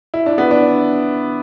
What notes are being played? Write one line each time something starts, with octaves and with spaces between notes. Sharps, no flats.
E4
D4
B3
D4